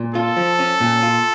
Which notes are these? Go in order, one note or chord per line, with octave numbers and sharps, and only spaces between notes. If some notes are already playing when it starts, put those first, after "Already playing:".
Already playing: A#2
F4 A4
F3
C#4
A#2
F4